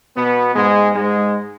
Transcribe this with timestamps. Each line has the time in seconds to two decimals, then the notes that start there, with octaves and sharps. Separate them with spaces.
0.17 B2 B3
0.56 G#2 G#3
0.95 G#2 G#3